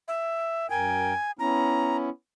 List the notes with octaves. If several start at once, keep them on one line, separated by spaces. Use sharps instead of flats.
E5
F#2 A#4 G5 G#5
B3 C#4 E4 A#5